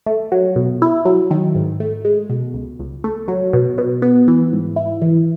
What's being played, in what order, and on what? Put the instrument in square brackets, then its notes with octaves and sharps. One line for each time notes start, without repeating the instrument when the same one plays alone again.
[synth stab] A3
F#3
B2
E4
F#3
D#3
G#2
A3
G#3
B2
C#2
C#2
A3
F#3
B2
B2
B3
E3
G#2
E4
E3